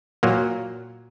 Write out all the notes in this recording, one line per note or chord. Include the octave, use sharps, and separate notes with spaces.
A#2 F#3 A#3